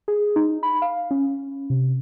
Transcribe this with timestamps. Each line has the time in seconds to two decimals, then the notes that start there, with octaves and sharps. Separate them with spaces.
0.08 G#4
0.36 D#4
0.63 B5
0.82 F5
1.11 C#4
1.70 C3